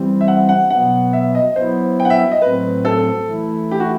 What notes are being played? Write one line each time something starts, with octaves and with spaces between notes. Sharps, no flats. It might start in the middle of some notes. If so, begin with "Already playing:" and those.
Already playing: E3 G3 C4
E5
F#5
F#5
B2 F#3 B3 F#5
E5
D#5
F#3 B3 E4 C5
G5
F#5
E5
D#5
A2 F#3 C4 B4
A4
E3 A3 E4
G4
F#4